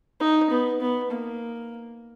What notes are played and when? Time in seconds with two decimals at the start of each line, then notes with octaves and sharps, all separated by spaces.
0.20 D#4
0.50 B3
0.81 B3
1.11 A#3